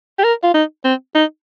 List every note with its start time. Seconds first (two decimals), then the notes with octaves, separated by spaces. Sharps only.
0.19 G4
0.24 A#4
0.43 F4
0.54 D#4
0.84 C4
1.15 D#4